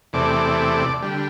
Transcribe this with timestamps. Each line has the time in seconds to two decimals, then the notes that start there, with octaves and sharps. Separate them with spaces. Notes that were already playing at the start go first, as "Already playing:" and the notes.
0.13 E2 C3 A3 D5
1.02 D3 G3